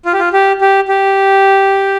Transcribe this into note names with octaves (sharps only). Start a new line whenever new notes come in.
F4
G4
F4
G4
G4
G4